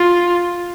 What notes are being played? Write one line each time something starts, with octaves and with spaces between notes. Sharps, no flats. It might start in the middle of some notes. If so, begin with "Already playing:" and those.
Already playing: F4